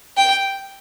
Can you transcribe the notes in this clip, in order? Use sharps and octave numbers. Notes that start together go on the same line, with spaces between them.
G5